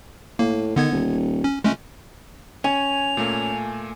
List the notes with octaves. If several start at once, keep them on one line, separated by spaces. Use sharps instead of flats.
A2 A#3
D3 D#3 B3 G#6
D#1
C#4
C#2 G#3 A3 C#4
C#4 G#5 F7
A#2 A3 A#3